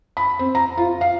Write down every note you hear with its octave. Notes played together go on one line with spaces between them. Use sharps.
B5
C4
A#5
F4
F5